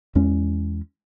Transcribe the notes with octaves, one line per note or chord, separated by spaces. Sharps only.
E2 G#3 C#4